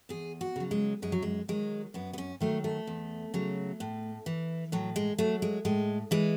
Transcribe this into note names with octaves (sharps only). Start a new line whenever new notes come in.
E2 G#4
F#4
C#3 F#3
G#3
F#2 G#3
F#3
G#3
D#3 F#3 G#3
F#2 B3
B3
C#4
D#3 F#3 A3
A3
E2
C#3 F#3
A2
E3
A2 F#3
G#3
F#3 A3
G#3
A2 G#3
E3 G#3